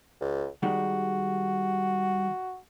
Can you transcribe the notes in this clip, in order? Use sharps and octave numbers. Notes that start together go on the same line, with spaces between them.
C#2
D#3 G3 G#3 F#4